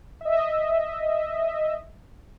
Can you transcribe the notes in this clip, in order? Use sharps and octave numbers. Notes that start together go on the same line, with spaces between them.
D#5 E5